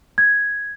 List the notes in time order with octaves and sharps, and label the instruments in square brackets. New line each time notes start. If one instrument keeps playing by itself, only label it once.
[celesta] G#6